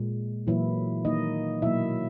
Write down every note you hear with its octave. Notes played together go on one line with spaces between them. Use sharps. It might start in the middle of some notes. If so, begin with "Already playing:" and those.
Already playing: A#2 G#3
A#2 E3 F#3 A#3 E4
D#3 A#3 D#4 D#5
B2 F#3 A#3 E4 E5